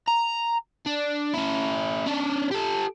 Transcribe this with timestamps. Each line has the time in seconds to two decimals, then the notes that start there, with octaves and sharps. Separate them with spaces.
0.08 A#5
0.86 D4
1.34 C#4 E4
2.06 C#4 D4
2.52 G4 A4